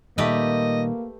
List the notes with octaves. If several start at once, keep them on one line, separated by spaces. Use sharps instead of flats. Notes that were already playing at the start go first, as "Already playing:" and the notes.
A#2 D#3 G3 A3 A#3 G4 B4 D#5